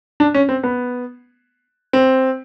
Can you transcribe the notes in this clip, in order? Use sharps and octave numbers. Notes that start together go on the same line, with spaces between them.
D4
C#4
C4
B3
C4